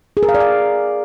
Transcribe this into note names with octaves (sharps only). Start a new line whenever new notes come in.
G#4
A#4
F5
D5
F5